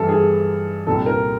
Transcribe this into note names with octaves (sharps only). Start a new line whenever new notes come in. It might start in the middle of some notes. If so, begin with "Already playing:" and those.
Already playing: G2 E3 G3 A4
G#4
C2 A#2 G3 A4
A#4